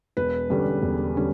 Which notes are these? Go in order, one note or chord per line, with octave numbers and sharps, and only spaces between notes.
E1 B4
E2 D3 G3 C#4
E1
D3 G3 C#4